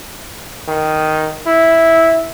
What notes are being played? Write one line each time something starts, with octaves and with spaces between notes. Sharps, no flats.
D#3
E4